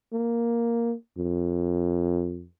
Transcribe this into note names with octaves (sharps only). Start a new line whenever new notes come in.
A#3
F2